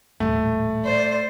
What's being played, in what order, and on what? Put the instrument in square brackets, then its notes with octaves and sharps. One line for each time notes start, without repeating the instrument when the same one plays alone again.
[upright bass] D#1 A1 [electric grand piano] A3
[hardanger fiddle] C5 [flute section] D5